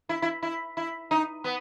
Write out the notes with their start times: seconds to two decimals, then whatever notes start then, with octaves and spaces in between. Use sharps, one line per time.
0.09 E4
0.22 E4
0.43 E4
0.77 E4
1.11 D#4
1.44 B3